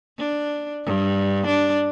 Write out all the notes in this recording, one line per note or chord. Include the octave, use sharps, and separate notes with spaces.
D4
G2
D4